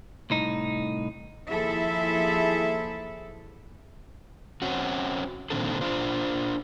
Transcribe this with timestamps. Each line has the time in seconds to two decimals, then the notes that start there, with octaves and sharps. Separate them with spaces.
0.30 C2 A2 D#4
1.48 D#2 F3 E4 G#4 A4 E5
4.62 C4 C#4 F#4
5.50 A#2 D3 D#3 C4 D4 A4
5.81 D4 F4 C5